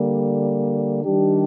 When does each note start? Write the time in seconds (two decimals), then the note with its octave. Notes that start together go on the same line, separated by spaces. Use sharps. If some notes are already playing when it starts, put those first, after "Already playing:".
Already playing: D3 G3 A#3
1.04 D#3 G3 D4 G4